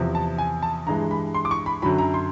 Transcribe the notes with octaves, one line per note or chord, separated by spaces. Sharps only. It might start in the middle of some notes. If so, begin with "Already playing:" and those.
Already playing: E2 C3 F3
A5
G#5
A5
G2 E3 G#3 A#5
B5
C6
D6
C#6
B5
F#2 D3 F#3 B5
A#5
C6